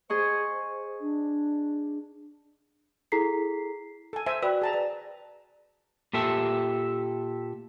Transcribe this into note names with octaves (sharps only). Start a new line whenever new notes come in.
G#4 C5 D#5 C#6
D4
E4 G#4 A4 A#5 B6 C7
A4 G#5
C5 E5 G#5
F#4 B4 D5 G5
G#4 A5 A#5
B4 D5
A#2 G4 A4 E5